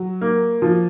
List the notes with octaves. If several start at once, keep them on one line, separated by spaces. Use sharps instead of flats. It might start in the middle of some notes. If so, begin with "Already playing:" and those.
Already playing: F#3
A#3
F3